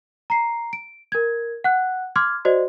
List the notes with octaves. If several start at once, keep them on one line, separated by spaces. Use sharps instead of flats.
A#5 C7
D7
A#4 G#6
F#5 F#6
C6 D6 F6 G#6
F#4 C5 D5 D#5